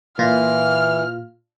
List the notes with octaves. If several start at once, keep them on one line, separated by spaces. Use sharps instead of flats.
A#2 E3 F4 F6